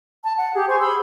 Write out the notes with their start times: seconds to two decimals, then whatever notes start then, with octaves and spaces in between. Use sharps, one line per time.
0.24 A5
0.38 F#5
0.55 G4 G#4
0.68 C5 G#5 C#6
0.80 G#4 B5 C6 E6